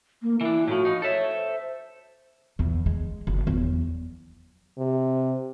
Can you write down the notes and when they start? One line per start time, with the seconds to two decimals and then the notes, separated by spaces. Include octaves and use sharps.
0.22 A#3
0.41 E3 D4 E4
0.68 A2 F3 F#4
0.85 D#4
1.02 A4 C#5 E5
1.34 C5
2.59 E2
2.86 G#3
3.27 F#1
3.47 E2 F#3
4.78 C3